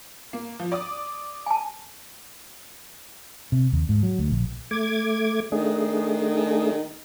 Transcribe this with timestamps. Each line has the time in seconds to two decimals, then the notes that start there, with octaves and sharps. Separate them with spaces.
0.33 A#3
0.60 F3
0.72 D5 D6 D#6
1.46 G#5 A5
3.52 C3
3.73 D#2
3.89 G#2
4.03 F#3
4.19 D2
4.30 A#1
4.71 A3 D6 G#6
5.52 D#3 A3 D4 G#4